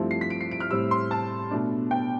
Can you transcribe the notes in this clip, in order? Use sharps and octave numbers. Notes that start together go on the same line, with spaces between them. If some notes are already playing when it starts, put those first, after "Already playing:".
Already playing: G2 F3 A3 C4 E4
C7
B6
D7
C7
D7
F6
A2 G3 C4 E6
C6
A5
B2 A3 D4
G5